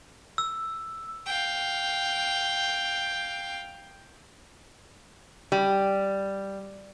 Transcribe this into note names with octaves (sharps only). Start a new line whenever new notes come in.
E6
F5 G5
G3